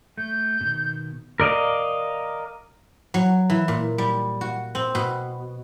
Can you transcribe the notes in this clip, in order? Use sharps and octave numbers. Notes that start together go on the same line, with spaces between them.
A3 G6
B2 D#3
A#4 D5 D#5 F5
F#3
E3
A#2
G3
F#4
C4
B2